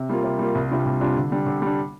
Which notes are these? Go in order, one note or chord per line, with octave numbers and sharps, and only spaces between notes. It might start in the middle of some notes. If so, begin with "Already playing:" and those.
Already playing: C3
G3 A#3 F4
C3
G3 A#3 F4
C2
C3 G3 D4 F4
C2
C3 G3 D4 F4
D3
G3 D4
D3
G3 D4